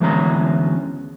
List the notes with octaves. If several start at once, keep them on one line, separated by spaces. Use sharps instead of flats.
D2 E3 G#3 B3 C#4 A#5